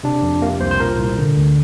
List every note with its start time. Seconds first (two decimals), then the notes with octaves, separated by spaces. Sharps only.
0.03 C3 D4
0.22 F2
0.42 C3 A#3
0.61 C2 C5
0.71 C5
0.80 A#2 A#4
0.99 C2
1.17 D3
1.36 D2